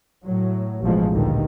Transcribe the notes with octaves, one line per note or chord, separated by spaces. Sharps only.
A2 F#3
A1 B2 F3 G#3
D2 G2 A#2 D3 D#3